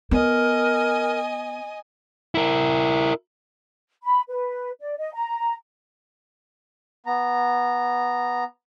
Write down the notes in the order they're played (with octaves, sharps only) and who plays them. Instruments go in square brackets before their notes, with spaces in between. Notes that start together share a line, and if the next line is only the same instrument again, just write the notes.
[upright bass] B3 [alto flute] A#4 [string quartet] D#5 G#5
[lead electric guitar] E4 A#4
[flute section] B5
B4
D5
D#5
A#5
[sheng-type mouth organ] B3 A#5